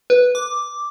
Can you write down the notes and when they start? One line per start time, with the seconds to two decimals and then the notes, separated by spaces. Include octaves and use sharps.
0.10 B4
0.35 D6